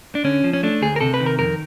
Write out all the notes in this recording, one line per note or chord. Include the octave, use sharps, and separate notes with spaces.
D4
D3 C#4
F3
C#4
A3 D4
D2 G#4
A#4
C3 A4
B4
D#3
A#4
F2 A#4